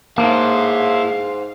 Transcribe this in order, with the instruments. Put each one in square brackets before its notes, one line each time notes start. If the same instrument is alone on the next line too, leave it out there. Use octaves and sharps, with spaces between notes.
[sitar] G#2 [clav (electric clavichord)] A#3 [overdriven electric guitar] E4 A5 [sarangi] F5